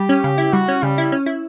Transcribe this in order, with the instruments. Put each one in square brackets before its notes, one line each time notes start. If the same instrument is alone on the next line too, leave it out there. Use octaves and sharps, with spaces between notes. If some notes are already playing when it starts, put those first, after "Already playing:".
Already playing: [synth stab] G3 [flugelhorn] G4
[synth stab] C#4
C#3
E4
[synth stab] G3 [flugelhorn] F#4
[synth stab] C#4
[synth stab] C#3 [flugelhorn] G3
[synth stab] E4
C#4
E4